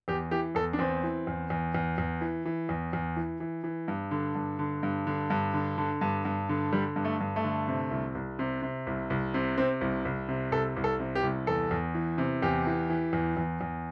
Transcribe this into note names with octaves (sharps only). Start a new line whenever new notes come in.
E2 G4
E3 G4
E2 A4
D4
E2 C4
E3
E2
E2
E2
E2
E3
E3
E2
E2
E3
E3
E3
G2
D3
G2
D3
G2
D3
G2
D3
D3
G2
G2
D3
D3 G3
G2
A3
G2
A3
D3
C3
C2
C2
C3
C3
C2
C2
C3
C3 C4
C2
C2
C3
C2 A4
C2
A4
C3
G4
C2
E2 A4
E2
E3
C3
E2 G4
E3
E3
E2
E2
E2